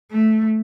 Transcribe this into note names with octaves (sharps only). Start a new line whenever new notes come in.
A3